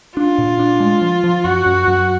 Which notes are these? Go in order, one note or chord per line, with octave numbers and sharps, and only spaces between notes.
D4 F4
A#2
D4
G#3
F3
F3
F#2 F#4
F#2
F#2